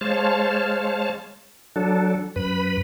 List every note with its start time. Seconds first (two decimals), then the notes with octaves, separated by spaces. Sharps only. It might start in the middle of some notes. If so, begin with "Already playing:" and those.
0.01 G#3 C5 C#5 F5 A5
1.76 F#3 D4 A4
2.36 F#2 B4 B5